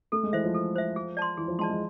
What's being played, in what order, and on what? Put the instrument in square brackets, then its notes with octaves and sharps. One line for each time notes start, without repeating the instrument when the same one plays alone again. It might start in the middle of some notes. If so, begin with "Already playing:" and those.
[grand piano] A3 [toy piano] A4
[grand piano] G#3
[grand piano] E3 [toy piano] C5 E5
[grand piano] F3
[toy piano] A4
C5 E5
G#4
D5 A5 C6
[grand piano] E3 [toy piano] G#4
[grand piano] F3
[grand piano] G#3 [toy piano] D5 A5 C6
[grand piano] G#3